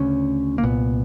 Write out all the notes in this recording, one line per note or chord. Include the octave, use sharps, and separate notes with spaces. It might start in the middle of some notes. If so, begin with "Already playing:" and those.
Already playing: D2 C#3 C#4
A#3
C2 A#2 B3